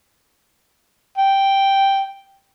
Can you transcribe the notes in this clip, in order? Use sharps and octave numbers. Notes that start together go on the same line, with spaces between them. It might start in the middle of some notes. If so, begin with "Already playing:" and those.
G5